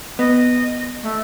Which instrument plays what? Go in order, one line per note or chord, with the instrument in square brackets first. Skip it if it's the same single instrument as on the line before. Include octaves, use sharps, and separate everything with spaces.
[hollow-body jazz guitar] B3 [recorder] D#5
[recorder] A3